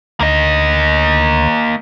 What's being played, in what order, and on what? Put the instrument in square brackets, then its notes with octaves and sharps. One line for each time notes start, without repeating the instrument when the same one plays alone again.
[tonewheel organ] D2 [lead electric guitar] A#3 D#5